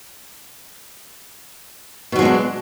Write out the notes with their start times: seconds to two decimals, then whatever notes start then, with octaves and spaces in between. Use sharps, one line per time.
2.12 B2
2.16 F#3
2.19 G#3
2.22 C4
2.25 D4